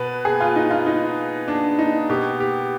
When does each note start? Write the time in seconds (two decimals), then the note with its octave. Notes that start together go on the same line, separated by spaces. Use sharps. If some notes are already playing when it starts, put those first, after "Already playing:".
Already playing: B2 B4
0.25 G#4
0.40 F4
0.56 D#4
0.71 F4
0.86 D#4
1.48 D4
1.79 D#4
2.10 B2 G4
2.40 G4